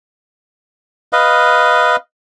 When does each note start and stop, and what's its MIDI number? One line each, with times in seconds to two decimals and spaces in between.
1.13 1.96 71
1.13 1.96 75
1.13 1.96 77